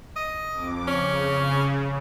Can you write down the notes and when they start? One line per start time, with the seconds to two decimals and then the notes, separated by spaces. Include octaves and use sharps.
0.16 D#5
0.51 F2 D6
0.88 C#3 C#4